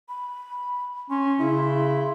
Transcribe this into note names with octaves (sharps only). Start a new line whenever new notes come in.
B5
C#4 C6
C#3 E4